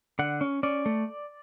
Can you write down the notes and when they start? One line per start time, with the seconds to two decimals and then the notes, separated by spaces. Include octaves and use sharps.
0.19 D3 F#5
0.41 C#4
0.63 C#4 D5
0.86 A3